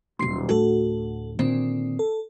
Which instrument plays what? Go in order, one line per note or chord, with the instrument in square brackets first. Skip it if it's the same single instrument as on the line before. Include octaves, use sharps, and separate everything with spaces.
[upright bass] D#1 B1 [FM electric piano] C6 C7
[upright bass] D2 A2 [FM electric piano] F#4 A4
[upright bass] A#2 D3 [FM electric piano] D#3 C4
[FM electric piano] A4